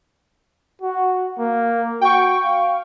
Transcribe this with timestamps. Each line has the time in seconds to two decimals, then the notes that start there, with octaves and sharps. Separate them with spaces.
0.82 F#4
1.39 A#3
2.01 F#4 G5 C#6
2.44 F5